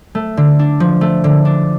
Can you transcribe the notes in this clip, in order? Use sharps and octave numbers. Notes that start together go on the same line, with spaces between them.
A3
D3
D4
F3
A3
D3
D4